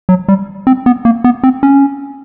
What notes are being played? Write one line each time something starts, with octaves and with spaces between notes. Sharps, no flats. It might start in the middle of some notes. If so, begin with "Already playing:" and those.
F#3
G3
C4
B3
A#3
B3
C4
C#4